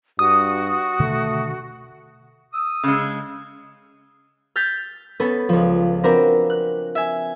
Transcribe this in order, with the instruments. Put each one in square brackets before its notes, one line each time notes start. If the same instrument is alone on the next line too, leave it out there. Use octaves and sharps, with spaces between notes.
[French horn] G2 [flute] F#4 [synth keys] D#6
[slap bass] B2 D3 D#3 [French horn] A3
[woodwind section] D#6 E6
[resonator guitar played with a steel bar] C#3 G#3
[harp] F6 G6 A6 B6
B3 C#4 A4 B4
C#2 F3
C4 D4 F#4 A#4 B4
F#6
E5 G#5